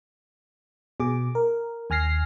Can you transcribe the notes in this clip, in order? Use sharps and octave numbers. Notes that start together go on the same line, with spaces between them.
B2 G#4 D6
A#4
D#2 G#5 F6 A#6 C7